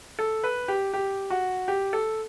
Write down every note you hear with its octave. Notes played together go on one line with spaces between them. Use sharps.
A4
B4
G4
G4
F#4
G4
A4